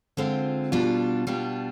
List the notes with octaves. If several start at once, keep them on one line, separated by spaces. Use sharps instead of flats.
D3 G#3 C4 F4 C5
B2 G3 D4 F4
B2 G3 D4 F4